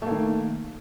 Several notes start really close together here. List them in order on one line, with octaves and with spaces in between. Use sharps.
A3 A#3 D#3